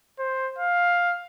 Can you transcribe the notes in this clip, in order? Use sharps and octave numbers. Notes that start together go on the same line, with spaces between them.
C5
F5